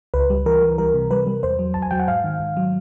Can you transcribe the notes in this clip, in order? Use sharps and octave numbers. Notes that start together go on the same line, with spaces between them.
C#2 B4
G3
E3 A#4
E3
G3 A#4
C3
G3 B4
G3
E2 C5
F#3
E2 A5
G#5
F#3 G5
F#5
G#2 F5
D#3
G#2
F#3